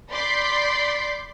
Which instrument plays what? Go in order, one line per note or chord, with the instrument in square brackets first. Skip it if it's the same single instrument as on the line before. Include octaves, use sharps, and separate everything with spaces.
[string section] D5 B5 C6 G6 B6 C7